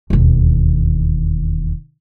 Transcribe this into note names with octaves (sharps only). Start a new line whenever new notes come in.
E1 D#2